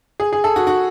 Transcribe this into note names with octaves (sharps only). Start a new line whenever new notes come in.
G#4
G#4
A4
F#4
F#4